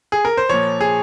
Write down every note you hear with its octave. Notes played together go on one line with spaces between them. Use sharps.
G#4
A#4
C5
A#2 F3 C#5
G#4